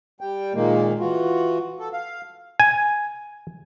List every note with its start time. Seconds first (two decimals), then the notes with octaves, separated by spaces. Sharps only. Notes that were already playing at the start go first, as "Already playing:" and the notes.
0.21 G3 G5
0.54 A#2 D#3 G#3 A#3
1.00 E3 F4 F#4
1.80 A4
1.93 F5
2.60 G#5